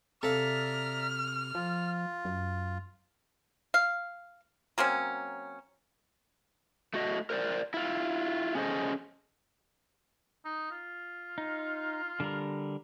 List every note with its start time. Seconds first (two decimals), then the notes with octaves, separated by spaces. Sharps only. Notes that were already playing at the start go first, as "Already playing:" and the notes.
0.23 C3 A4 D5 E5 F5 A#5 F6
1.55 F3 F4
2.25 F#2
3.74 F5
4.78 F#3 A#3 C4 C#4
6.94 A3 F#4 D#5
7.30 A#4 C5 D5
7.74 E4 F4
8.55 C#4 G#4 A4 C5 D#5
10.45 D#4
10.71 F4
11.38 D#4
12.20 D3 G3 A#4